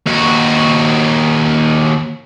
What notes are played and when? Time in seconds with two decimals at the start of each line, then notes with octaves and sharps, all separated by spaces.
0.07 D#2 F#4